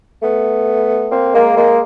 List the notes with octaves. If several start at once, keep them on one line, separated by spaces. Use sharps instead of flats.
A3 B3
A#3 C4
G#3 A#3
G#3 A#3